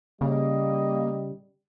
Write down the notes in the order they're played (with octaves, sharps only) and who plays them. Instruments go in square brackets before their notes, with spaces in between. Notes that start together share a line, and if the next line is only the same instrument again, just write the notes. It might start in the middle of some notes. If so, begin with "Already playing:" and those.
[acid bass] C#3 [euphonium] G3 [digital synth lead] A#3 [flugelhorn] D#5